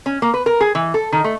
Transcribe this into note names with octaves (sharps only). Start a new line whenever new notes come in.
C#4
A#3
B4
A#4
G#4
E3
A4
D#3
A3